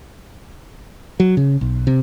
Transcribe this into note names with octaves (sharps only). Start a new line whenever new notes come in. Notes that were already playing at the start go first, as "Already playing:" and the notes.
F#3
C#3
B1
C3